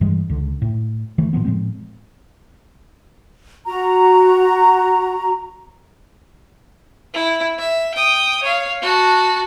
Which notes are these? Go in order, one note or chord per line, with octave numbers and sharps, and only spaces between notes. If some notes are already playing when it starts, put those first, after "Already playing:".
G2 E3 G3 G#3
C#2 D3
A2
D#3 E3 A3
A2 E3 F3 B3
A2 F3 G#3 C4
F#4 A#5
E4
E5
G5 D#6
C#5 F5
F#4 A5